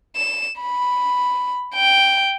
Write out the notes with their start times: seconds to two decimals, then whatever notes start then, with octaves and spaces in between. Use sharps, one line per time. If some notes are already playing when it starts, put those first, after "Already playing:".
0.16 E7
0.61 B5
1.75 G5